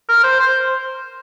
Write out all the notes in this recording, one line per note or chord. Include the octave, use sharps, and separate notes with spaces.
A#4
C5
C5